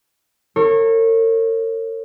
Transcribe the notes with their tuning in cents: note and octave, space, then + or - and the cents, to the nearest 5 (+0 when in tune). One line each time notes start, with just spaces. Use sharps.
A#4 -45 C#5 -25